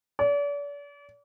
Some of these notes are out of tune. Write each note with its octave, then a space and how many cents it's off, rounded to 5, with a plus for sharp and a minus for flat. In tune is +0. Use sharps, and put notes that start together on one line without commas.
D5 -40